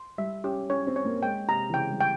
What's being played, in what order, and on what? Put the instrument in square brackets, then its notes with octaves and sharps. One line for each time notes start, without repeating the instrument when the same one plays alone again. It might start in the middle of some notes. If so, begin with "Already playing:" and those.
Already playing: [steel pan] C6
[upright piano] G3 [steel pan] E5
[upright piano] C#4 [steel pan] G4
[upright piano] C#4 [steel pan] C#5
[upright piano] C4
[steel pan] C#5
[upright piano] A#3
[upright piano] G#3 [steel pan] G5
[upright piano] C3 [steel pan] A#5
[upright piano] E3
[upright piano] C#3 [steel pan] G5
[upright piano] G3
[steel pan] G5